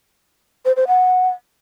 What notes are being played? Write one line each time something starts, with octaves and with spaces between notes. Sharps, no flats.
C5
C5
F#5